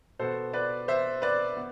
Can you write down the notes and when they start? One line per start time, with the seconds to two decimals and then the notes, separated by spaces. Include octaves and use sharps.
0.19 B2 B3 A4 C5
0.53 B4 D5
0.88 C5 E5
1.22 B4 D5
1.57 B3